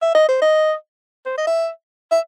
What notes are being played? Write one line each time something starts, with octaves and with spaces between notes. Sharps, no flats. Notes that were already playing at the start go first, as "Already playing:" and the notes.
E5
D#5
C5
D#5
C5
D#5
E5
E5